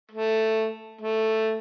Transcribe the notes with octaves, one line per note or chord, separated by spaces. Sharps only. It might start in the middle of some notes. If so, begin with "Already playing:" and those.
A3
A3